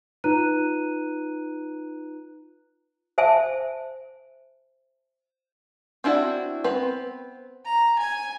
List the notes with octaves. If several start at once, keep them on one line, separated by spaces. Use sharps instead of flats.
D#4 F4 B4 A#5 F#6 D#7
C5 E5 G#5 A5
C4 D4 E4 F#4
B3 C4 B4
A#5
G#5